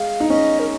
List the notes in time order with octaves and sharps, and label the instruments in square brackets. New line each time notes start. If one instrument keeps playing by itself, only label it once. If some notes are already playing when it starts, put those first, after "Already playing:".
Already playing: [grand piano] G#3 [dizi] F5
[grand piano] D#4
[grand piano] C#4 [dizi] D#5
[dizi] A#4